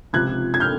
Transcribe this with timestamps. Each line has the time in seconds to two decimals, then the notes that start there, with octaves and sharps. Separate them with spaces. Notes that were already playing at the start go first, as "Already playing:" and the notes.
0.13 C#2 C3 F3 F#6 G#6
0.54 G#6
0.60 F6 G6